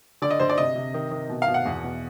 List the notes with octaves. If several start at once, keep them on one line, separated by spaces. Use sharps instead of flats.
D3 D5
D#5
D3 C5
D5
C3 D#5
C3
D#3
D#3
B2
F5
B2
F#5
E2
B2